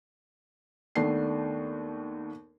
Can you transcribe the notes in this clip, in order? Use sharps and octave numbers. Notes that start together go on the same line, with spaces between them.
D#2 A3 B3 D4 C7